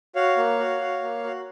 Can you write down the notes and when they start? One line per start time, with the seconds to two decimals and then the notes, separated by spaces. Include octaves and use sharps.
0.16 F#4 C#5 F5
0.37 A#3
0.59 F#4
0.80 F#4
1.03 A#3
1.24 F#4